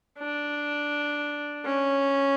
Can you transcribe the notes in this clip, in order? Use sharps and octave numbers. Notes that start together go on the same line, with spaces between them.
D4
C#4